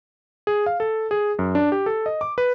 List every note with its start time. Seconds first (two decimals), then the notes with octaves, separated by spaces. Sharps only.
0.47 G#4
0.66 F5
0.80 A4
1.11 G#4
1.39 F#2
1.55 D4
1.72 G4
1.86 A4
2.06 D#5
2.21 D6
2.38 B4